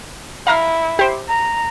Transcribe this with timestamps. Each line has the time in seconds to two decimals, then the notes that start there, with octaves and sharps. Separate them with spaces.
0.47 E4 F5 A#5 F6
0.99 G4 C5
1.28 A#5